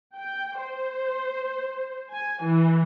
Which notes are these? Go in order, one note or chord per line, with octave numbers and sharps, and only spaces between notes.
G5
C5
G#5
E3